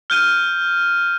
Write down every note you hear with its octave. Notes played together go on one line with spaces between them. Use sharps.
F6 G6 D#7